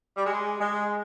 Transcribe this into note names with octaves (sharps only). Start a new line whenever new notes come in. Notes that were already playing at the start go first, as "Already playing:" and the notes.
G3
G#3
G#3